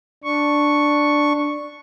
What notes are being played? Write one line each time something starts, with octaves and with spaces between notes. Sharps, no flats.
D4 C#6